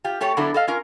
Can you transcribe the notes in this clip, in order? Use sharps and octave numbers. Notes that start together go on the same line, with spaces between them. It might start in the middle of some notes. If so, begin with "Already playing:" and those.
F4 G4
A3 G4 A4 C#5
D3 F#3 B3 D4 E4 A4
A4 D#5 F5
C#4 F4 A#4